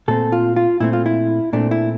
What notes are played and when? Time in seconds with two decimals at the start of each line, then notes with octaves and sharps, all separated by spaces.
0.08 A#2 A3 C4 A4
0.32 F4
0.56 F4
0.80 A#2 A3 C4 E4
0.93 F4
1.06 E4
1.53 A#2 A3 C4 D4
1.71 E4